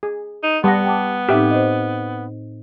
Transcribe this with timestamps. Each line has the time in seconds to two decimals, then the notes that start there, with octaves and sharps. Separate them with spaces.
0.03 G#4
0.43 D#4
0.64 G3 B3 F#5 A5 D#6 A#6
0.85 G5 A5 D6
1.29 A2 C4 D#4 G4 E5
1.51 C5 D#5